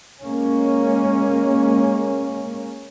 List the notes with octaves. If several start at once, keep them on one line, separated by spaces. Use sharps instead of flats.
G#3 A#3 C#4